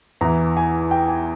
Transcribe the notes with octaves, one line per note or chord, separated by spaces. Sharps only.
E2 E3 A#5
G#5
G5
G#5